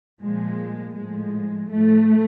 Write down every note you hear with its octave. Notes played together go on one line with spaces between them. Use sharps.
A#2 F3 G#3
A2 F3 G#3
A2 F3 A3